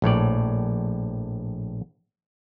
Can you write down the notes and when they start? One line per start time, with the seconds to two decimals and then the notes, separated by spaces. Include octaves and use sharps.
0.02 A#1 A2 C#5 D5